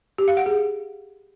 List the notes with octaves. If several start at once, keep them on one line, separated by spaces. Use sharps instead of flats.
G4
F5
F#5
G#4